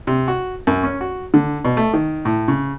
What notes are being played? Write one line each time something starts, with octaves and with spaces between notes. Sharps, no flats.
C3
F#4
F#2
C#4
F#4
D3
B2
A3
D#3
A2
C#3